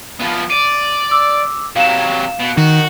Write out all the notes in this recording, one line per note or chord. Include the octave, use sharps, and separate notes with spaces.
F3 B3
D5 D#7
D6 E6
C3 F#3 F5 E7
B2
D#3 F#4